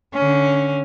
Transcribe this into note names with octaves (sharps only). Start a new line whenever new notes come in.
D3 C#4